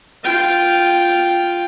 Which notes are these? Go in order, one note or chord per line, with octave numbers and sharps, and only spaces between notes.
F4 G5